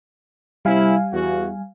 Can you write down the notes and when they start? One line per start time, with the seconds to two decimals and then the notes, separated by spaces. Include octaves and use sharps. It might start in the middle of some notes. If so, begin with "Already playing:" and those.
0.65 C3 G3 E4 F5 G#5
1.13 E2 F#4